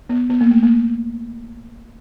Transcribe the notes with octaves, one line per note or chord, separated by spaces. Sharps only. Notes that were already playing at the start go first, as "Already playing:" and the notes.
B3
B3
A#3
A3
A#3